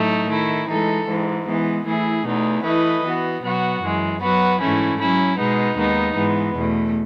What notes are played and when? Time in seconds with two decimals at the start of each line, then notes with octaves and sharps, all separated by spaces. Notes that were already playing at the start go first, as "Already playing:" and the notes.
Already playing: A2 F#3 A3 D#4
0.28 D#3 A3 E4
0.67 E3 G#3 D#4 A4
1.07 G#2 E3 G#3
1.46 E3 G#3 B3
1.85 E3 A3 E4 G#4
2.25 E2 B2 A3 D#4
2.63 E3 A3 E4 B4 D#5
3.02 E3 B3 F#4
3.41 B2 F#3 B3 F#4
3.81 F#2 E3 G#3
4.20 F#3 B3 F#4 B4
4.59 G#2 E3 A3 C#4 E4
4.99 F#3 C#4 E4
5.37 B2 G#3 B3 D#4
5.77 D#2 D#3 G#3 B3 D#4
6.16 G#2 E3 G#3 B3
6.54 E2 B2 A3